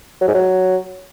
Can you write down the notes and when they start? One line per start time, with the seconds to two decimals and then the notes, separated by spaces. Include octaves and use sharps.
0.21 F#3
0.28 G#2
0.34 F#3